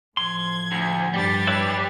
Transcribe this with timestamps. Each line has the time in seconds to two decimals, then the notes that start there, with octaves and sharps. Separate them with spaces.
0.17 A2 F3 C6 G#6
0.72 D2
1.13 G2 G3 D4 G4 A6
1.47 E4 B4 C#5